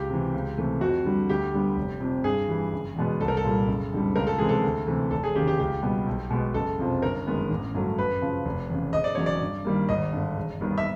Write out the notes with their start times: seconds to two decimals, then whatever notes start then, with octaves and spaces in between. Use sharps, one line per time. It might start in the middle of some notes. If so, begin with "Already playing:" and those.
Already playing: C#2 G4
0.09 C3 E3
0.34 C#2
0.58 C3 E3 A3
0.81 F2 F#4
1.05 D3 G3
1.29 D2 G4
1.54 D3 G3 B3
1.77 F1
2.00 F2 C3
2.24 G2 G#4
2.48 E3 G3
2.73 F#1
2.96 E2 B2 G#3 B3
3.21 C2 A4
3.28 A#4
3.37 A4
3.44 A#2 G3
3.68 F#1
3.92 F2 D3 G3
4.16 C#2 A#4
4.27 A4
4.39 C3 E3 G#3 G#4
4.49 A4
4.64 D2
4.87 C3 E3 A3
5.11 F1 A4
5.24 G#4
5.35 D#2 C#3 G4
5.48 G4
5.59 C#2 G4
5.82 B2 G3 B3
6.06 B1
6.30 B2 G#3 B3
6.54 F#1 A4
6.78 F2 C3 F3
7.02 G1 A#4
7.27 F#2 D#3 G#3 B3
7.50 A1
7.74 G2 D3 F#3 A3
7.98 F#2 B4
8.22 C#3 F3
8.45 F1
8.70 E2 C#3
8.93 E1 D#5
9.04 D5
9.15 E2 C#3 F#3 C#5
9.26 D5
9.41 G2
9.65 D#3 G3 A#3
9.89 G#1 D#5
10.13 G2 D3
10.37 E1
10.60 D#2 D#3 G3 B3
10.78 E5